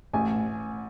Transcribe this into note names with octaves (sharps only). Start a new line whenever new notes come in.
A1 G#5